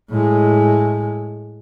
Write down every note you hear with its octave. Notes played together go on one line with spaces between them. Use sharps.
A2 G#3